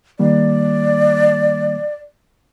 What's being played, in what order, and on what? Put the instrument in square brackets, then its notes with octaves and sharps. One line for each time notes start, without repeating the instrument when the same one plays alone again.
[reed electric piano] D#3 G3 A#3 [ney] D5